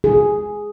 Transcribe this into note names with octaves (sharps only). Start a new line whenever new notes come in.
G#4